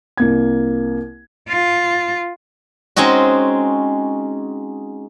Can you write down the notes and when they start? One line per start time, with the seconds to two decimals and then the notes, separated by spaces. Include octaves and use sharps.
0.17 C2 A#3 G#6
1.48 F4
2.96 G#3 C4 C#4 D#4 F#4